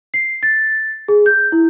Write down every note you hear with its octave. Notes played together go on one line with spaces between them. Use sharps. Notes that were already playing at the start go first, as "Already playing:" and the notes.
C7
A6
G#4
G6
E4